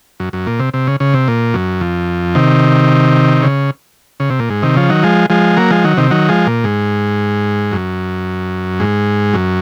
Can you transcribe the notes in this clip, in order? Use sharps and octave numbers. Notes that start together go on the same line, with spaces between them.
F#2
F#2
A#2
C3
C3
C#3
C#3
C3
A#2
F#2
F2
C3 D#3
C#3
C#3
C3
A#2
G#2
C3 D#3
C#3 F3
D#3 F#3
F3 G#3
F3 G#3
F#3 A#3
F3 G#3
D#3 F#3
C3 D#3
D#3 F#3
F3 G#3
A#2
G#2
F#2
G#2
F#2